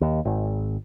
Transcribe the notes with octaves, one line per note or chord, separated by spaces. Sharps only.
D#2
G#1